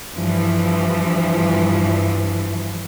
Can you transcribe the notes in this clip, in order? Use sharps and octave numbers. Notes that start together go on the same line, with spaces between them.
G2 E3 F3